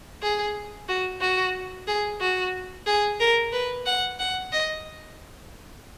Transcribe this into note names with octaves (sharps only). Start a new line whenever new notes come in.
G#4
F#4
F#4
G#4
F#4
G#4
A#4
B4
F#5
F#5
D#5